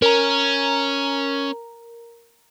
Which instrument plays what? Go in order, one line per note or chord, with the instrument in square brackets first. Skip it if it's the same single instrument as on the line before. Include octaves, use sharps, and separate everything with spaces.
[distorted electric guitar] C#4 [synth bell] A#4 A#5